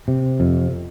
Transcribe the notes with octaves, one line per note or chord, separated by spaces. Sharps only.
C3
F2